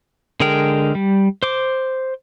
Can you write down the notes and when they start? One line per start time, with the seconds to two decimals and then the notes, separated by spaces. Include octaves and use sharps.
0.40 D3 G#3 G#4 A#4 G5
0.95 G3
1.43 C5 D6